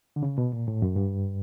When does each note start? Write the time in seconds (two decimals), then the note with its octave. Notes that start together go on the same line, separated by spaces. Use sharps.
0.16 D3
0.23 C#3
0.38 B2
0.53 A#2
0.68 A2
0.82 F#2
0.96 G2